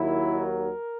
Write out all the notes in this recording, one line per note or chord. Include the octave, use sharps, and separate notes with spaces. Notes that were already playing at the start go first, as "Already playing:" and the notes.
Already playing: D#2 D#3 F#3 E4
A#4